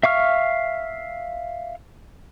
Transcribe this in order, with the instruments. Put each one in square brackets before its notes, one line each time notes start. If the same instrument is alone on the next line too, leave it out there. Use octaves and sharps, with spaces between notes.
[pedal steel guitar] E5 F5 C#6 F6